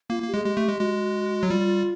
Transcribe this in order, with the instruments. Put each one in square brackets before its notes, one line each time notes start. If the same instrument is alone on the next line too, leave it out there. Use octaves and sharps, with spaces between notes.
[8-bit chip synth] A#3 [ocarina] F4
[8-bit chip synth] A#3
[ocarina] G4
[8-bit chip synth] G#3 [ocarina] G#4
[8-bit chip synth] G#3 [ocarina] G4
[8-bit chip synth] A3
G#3
[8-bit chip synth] G#3 [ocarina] F#4
[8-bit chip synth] F#3
[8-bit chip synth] G3 [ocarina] F4